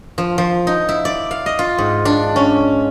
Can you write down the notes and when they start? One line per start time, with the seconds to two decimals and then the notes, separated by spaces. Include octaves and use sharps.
0.18 F3
0.38 F3
0.67 D#4
0.89 E4
1.05 D5
1.31 F5
1.46 D#5
1.59 F4
1.78 G#2
2.05 D4
2.36 C#4